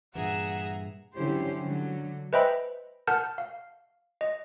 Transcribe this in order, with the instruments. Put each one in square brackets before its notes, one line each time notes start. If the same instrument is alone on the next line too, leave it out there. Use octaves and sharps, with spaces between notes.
[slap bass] G2 A#2 E3 [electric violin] G#4 A#5 [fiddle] E5 [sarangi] F#5
[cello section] D3 F#3 C#4 E4 G4 C5
D3 F#3
[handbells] B4 C5 D#5 E5 G5 B5
A#4 F#5 A5 F6 G6
F5
D#5